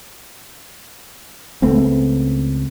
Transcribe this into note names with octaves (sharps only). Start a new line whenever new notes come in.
C#2 A3 B3 C4